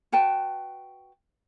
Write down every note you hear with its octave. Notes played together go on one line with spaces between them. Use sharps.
F#4 B4 G5 A5